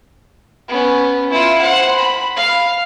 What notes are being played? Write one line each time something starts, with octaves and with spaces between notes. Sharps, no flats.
B3 C#4
E4 F4
C5 F#5
B5
F5